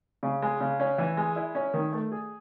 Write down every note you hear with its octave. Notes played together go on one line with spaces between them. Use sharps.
C#3
G#3
C#3
C#4
E3
G#3
E4
C#4
D#3
A3
G#4